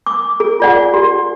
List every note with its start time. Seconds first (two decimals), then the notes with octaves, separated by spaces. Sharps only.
0.06 D6
0.40 G#4
0.60 F4 D5 F#5
0.94 G4